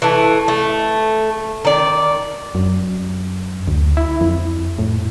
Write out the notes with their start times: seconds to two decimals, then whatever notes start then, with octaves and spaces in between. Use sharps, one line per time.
0.02 E3 A3
0.48 A3
1.65 D#3 D5
2.55 F#2
3.67 D2
3.97 E4
4.21 F2
4.79 A2